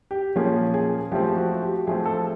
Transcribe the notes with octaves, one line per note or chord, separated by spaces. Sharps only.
G4
A#2 F3 A#3 C#4 G#4
G#4
F3 A3 C4 G4
F#4
F#4
G4
F3 A3 C4 G#4
A4